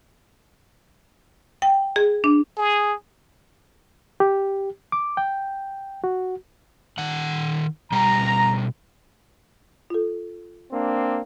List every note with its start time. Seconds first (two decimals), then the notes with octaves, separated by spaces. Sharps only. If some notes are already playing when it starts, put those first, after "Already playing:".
1.62 G5
1.96 G#4
2.24 D4
2.57 G#4
4.20 G4
4.92 D6
5.17 G5
6.04 F#4
6.98 D#3 F#5
7.92 B2 G3 G5 A#5
9.90 F4 A4
10.72 A#3 C4 D4